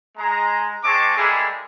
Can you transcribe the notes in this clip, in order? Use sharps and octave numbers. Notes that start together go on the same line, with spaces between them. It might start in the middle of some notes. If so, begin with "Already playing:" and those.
G#3 A#5
G#3 C4 A5 C#6 D6
G3 G#3 A#3 E4 G#4 A4